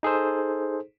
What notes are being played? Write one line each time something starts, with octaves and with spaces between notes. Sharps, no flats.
D#4 G#4 A4 C5